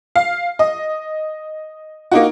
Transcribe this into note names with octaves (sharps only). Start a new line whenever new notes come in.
F5
D#5
A#3 D#4 F#4